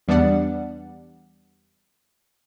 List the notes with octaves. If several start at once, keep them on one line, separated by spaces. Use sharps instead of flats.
E2 G3 B3 D4 D5 F#5